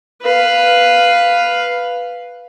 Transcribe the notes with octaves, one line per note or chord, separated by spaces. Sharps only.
B4 F5